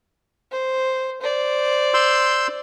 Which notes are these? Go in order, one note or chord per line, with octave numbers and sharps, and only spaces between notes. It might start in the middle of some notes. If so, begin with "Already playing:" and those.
C5
C5 D5
C6 E6 G6